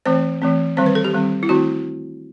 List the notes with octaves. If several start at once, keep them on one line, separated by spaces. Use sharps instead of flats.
E3 A3 C4 C5
E3 A3 C4
D#3 G3 C4 C5
B4
A4
G4
D#3 G3 C4
E4
D#3 A3 C4 F#4